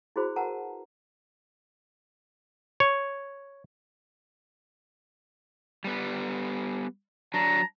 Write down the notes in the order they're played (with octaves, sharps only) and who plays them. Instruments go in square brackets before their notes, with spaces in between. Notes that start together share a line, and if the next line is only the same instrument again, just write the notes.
[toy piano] E4 F#4 G#4 C5 B5
A#4 B4 F#5 A5 A#5
[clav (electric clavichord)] C#5
[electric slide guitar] G3 B3
[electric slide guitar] F#3 D4 [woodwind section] A5 A#5